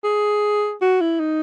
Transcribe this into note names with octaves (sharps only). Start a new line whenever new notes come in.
G#4
F#4
E4
D#4